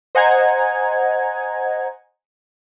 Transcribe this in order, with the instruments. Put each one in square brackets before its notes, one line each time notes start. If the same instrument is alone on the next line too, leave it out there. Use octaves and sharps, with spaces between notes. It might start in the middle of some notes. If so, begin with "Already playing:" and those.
[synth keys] C5 D#5 F#5 G#5 A#5 G#6